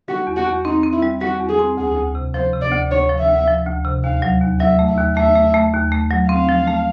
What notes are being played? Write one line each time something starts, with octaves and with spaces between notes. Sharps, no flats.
G3 F#4
E2
F#4
E2
C4 D#4
C4
E4
G3
G3 F#4
E2
G#4
C4
D2 G#4
D2
C3
F3 C5
C3
D5
D2
D2 C#5
F3
E5
D2
F3
D2
C3
D#2 F5
F#3
D#2
F#3 E5
A3
E5
D#2
A3 E5
A3
A3
D#2
A3
F#3
C4 F5
F3
A3